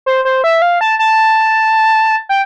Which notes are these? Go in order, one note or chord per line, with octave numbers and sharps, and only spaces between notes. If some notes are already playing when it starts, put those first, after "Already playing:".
C5
C5
E5
F5
A5
A5
G5